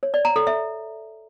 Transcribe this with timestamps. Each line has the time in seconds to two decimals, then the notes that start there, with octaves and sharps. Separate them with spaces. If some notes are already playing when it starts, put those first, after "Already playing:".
0.03 C#5
0.14 D5
0.25 A#5
0.36 A4
0.47 E5